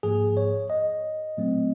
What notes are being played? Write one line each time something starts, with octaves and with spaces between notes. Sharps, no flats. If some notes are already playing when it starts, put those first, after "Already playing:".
G#2 F3 A#3 G#4
C#5
D#5
A#2 F#3 A3 C4